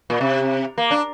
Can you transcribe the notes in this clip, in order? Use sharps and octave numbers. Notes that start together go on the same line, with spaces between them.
A#2
C3
A#3
D4